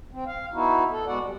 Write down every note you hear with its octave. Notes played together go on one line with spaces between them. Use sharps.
C4
F5
B3 D#4 E4 F#4
A4
G#3 B3 F#4 D5 F#5
G3